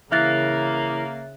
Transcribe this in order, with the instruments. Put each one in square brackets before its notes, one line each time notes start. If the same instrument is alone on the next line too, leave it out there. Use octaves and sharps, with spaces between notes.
[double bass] C#3 [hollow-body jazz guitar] E3 [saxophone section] A#3 [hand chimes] E5 F#6 A6